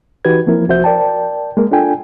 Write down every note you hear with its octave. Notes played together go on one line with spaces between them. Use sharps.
E3 D#4 F#4 G4 B4 G#6
F3 A#3 C4 E4 A#4
C2 F3 F#4 C5 E5 G6
A#4 D5 G5 A5
G#3 A#3 A#4
D4 F4 A4 G5 G#5